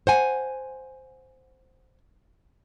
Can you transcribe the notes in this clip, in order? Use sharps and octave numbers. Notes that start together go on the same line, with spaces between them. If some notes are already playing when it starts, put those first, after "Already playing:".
C5 F#5 G#5